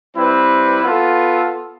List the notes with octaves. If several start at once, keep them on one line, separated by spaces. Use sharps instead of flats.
G3 C4 E4 B4
B3 F4 A4